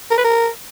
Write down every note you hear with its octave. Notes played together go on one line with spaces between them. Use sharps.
A#4
B4
A#4